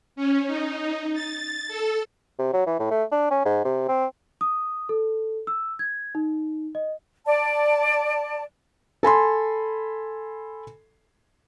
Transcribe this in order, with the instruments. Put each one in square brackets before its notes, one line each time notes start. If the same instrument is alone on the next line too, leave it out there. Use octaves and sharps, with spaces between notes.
[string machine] C#4
D#4
A6
A4
[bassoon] C3
F#3
E3
A2
A3
D4
C#4
G#2
C3
C4
[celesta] D#6
A4
E6
G#6
D#4
D#5
[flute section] D5 A5
[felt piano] A4 G#5 B5 C6